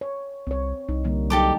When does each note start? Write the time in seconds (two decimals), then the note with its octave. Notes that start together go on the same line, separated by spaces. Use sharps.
0.01 C#5
0.47 C2 C4 C#5
0.89 C2 D#4
1.04 D3 G3 A#3
1.30 F#3 D#4 G4 A4 D6